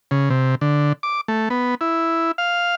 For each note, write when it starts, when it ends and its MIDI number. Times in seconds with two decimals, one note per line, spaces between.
0.11 0.29 49
0.30 0.55 48
0.61 0.93 50
1.03 1.21 86
1.28 1.49 57
1.50 1.75 59
1.81 2.32 64
2.38 2.75 77